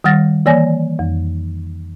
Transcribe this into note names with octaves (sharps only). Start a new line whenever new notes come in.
D#3 G3 F#5 F6 A6 A#6
E3 A#3 C#5 D5 G#5 A#6
F2